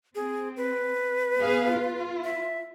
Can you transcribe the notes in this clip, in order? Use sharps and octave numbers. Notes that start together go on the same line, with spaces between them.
C4 G#4
B4
B3 G#4 F5
F4
E5